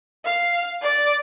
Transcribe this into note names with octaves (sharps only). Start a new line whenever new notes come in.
F5
D5